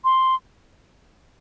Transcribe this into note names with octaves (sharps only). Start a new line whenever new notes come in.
C6